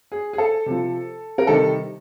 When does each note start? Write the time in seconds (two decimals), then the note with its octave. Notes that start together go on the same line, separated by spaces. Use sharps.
0.12 G#4
0.33 G#4
0.38 A4
0.66 C3 F3
1.38 A#4
1.47 C3 D#3 G3 A4